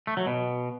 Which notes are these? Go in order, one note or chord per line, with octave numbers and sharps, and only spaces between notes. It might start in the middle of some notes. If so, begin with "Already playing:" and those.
A3
F#3
B2